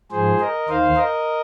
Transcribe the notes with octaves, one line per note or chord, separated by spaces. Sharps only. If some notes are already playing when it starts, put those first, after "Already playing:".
G#2 F3 G#4 C5
A#4 D#5
D#2 D#3 C5 F5
A#4 D#5